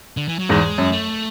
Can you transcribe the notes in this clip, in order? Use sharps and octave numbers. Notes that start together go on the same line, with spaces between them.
D3
E3
F#3
E2 G#2 G#3
F#2
A3